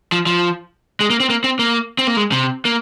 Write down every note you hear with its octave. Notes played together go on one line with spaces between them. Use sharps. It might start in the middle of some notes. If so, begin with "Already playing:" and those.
F3
F3
G#3
A#3
C4
A#3
C4
A#3
C4
A#3
G#3
C3
A#3